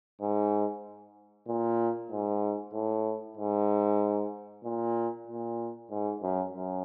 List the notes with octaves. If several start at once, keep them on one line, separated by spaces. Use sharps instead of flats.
G#2
A#2
G#2
A2
G#2
A#2
A#2
G#2
F#2
F#2